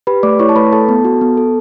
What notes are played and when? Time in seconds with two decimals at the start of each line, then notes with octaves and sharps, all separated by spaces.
0.07 G4 B4 B5
0.23 A3 D5 D6
0.39 E4 C#5 C#6
0.49 A5
0.56 A3 B4 B5
0.73 A4 A5
0.89 B3
1.05 F#4
1.21 B3
1.37 A4